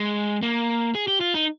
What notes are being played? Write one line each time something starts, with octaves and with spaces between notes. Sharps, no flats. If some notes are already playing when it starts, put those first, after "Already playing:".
Already playing: G#3
A#3
G#4
G4
F4
D#4